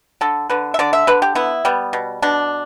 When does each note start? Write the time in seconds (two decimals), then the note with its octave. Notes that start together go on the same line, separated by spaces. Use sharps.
0.21 D3 A4
0.50 D3 B4
0.74 E5
0.79 D3 D5
0.93 E5
1.07 D3 B4
1.22 G4
1.35 B3 E4
1.65 G3 B3
1.93 B2
2.22 B2 D4